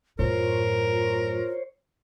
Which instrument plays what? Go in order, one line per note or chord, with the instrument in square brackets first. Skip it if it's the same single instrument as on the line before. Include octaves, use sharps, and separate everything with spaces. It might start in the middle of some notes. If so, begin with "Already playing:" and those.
[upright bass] F#2 A2 [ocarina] F4 [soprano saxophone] A#4 [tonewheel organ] C5 C#5